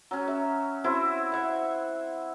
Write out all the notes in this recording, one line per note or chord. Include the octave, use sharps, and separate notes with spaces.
F#3 C#4
E5
C4 E4 F#4 C5
C5 E5 F#5